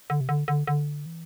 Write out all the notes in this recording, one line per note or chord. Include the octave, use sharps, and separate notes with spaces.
D3
C3
D3
D3
D3
E3